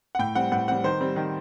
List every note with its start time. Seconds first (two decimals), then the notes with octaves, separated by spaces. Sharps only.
0.15 F#5
0.19 A2 G5
0.35 G3 C4 F#5
0.52 A2 F#5
0.68 G3 C4 F#5
0.84 D#3 C5
1.01 G3 C4
1.16 D#3